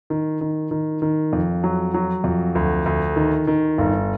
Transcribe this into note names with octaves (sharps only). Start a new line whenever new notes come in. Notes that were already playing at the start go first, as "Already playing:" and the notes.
D#3
D#3
D#3
D#3
F2
F#3
F#3
F2
D2
D2
D#3
D#3
G1